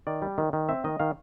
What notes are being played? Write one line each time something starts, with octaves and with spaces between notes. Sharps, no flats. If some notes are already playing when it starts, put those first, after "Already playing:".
D#3 D5
G3
D#3
D#3
C4 E5
D#3 D#5
D#3 F5